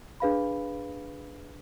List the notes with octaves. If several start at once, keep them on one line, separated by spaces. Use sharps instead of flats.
D4 G#4 B4 F5 B5